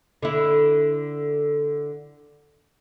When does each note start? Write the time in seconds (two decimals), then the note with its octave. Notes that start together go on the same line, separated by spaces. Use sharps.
0.22 D3 E4